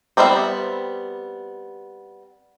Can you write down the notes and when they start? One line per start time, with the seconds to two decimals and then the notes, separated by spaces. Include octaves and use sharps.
0.17 G3 B3 C4 B4 E5